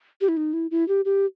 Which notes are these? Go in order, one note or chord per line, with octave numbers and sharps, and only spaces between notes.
G4
E4
D#4
E4
E4
G4
G4